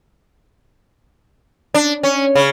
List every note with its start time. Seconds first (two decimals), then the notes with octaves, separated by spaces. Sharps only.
1.74 D4
2.03 C#4
2.35 C#3